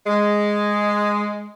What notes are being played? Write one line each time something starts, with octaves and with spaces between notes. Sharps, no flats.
G#3